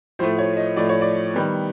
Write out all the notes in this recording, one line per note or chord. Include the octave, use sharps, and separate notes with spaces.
A2 F3 A3 C5
C#5
D#5
A2 F3 A3 D5
C#5
D5
D#3 G3 B3